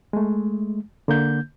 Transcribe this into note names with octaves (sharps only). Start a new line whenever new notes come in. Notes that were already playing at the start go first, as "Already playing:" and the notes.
G#3 A3
D3 A#3 G6